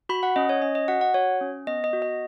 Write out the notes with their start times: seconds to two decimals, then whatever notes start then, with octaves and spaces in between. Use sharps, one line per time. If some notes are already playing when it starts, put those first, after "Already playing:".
0.09 F#4 B5
0.23 F#5
0.36 C#4 D#5
0.49 C#5
0.62 C#4 D#5
0.75 D#5
0.88 F#4 F#5
1.01 F#5
1.14 F#4 C#5
1.41 C#4
1.67 B3 D#5
1.84 D#5
1.93 F#4
2.02 D#5